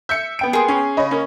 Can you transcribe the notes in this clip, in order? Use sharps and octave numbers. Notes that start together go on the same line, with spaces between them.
E5 G6 C#7
B3 G5 D7
A#3 G#4 C6
C#4
C#3 C#5 D#5 B5
A#3 C#4